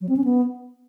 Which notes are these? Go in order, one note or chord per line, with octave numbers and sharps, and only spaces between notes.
F#3
C4
C#4
B3